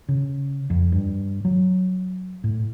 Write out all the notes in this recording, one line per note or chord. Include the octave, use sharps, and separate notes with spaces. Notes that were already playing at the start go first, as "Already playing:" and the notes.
C#3
F2
G2
F#3
A2